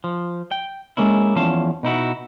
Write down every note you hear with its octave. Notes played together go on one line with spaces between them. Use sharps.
F3
G5
G#3 A#3 C#4 E4
E2 F3 C#4 F5 A5
B2 D#4 E4 F#4